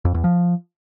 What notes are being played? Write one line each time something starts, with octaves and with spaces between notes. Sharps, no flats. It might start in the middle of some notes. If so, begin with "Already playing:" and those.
F2
E2
F3